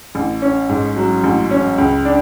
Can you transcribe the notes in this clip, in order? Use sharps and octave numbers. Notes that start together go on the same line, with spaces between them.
A1
C#4
G#2
F#3
A1
C#4
C#2
D4